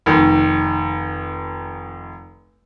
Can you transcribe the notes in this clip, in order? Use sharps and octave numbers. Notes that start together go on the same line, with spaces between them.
F1 D#3